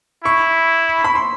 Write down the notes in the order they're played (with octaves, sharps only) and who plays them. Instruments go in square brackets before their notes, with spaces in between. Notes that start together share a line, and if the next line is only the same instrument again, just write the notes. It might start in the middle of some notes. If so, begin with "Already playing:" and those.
[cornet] E4 [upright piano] C#6
[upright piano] B5
C6